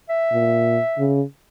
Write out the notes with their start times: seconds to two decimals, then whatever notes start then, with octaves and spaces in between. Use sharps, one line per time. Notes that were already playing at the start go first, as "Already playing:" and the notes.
0.09 E5
0.32 A#2
0.98 C#3